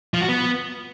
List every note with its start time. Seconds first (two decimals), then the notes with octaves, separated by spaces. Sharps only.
0.14 F3
0.21 F#4
0.29 B3